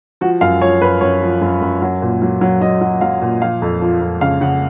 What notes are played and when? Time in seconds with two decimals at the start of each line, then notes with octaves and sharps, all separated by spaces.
0.21 F3 F#4
0.41 F#2 F5
0.61 F3 C#5
0.81 F#2 B4
1.01 F#2 C#5
1.22 F3
1.41 F#2
1.61 F#2
1.82 F#3
2.02 A#2
2.22 F#3
2.41 F#3
2.61 F#3 D#5
2.81 F#3
3.01 F#3 F5
3.21 A#2
3.42 F3 F5
3.62 F2
3.82 F3
4.01 F2
4.21 C#3 F5
4.41 C#3 F#5